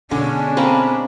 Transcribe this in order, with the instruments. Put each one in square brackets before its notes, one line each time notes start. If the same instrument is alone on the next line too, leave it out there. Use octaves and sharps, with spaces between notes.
[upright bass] B2 [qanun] D3 [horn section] G#3 D4 [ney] C#4
[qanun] A#3 C4 C#4 [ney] B5